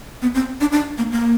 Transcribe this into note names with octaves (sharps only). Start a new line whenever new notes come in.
B3
C4
D4
D4
A#3
A#3